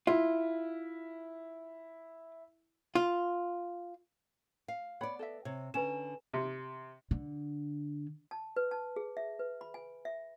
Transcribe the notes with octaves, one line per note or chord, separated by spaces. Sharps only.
E4 F4
F4
F5
B3 C#5 D5 F#5 B5
A4 D#5 E5
C3 C#5
D3 C#4 B4 G#5 A#5 E7
C3
D3
A5
B4
A5
G#4
E5
B4
B5
G#5
E5